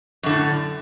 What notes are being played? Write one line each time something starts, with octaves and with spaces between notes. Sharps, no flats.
F#2 A2 D3